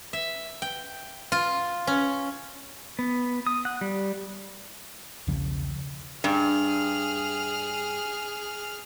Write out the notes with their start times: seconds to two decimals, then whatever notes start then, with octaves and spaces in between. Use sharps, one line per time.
0.13 E5
0.62 G5
1.32 F4
1.87 C#4
2.99 B3
3.47 D#6
3.65 F#5
3.81 G3
5.27 B1 E2 C#3 F3
6.24 G2 G#4 F6